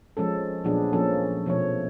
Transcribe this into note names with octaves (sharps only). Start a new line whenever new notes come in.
F3 G#3 C#4 A4
A#2 F3 F#3 B3 D4 G#4
F3 A#3 C#4 A4
B2 F3 A3 C#5